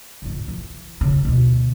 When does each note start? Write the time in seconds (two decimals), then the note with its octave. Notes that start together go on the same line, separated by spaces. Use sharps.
0.22 C#2 G#2
0.48 E3
1.01 C#3
1.25 D2 B2